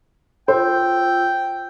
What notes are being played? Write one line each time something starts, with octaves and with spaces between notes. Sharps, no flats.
F4 C5 G5 E6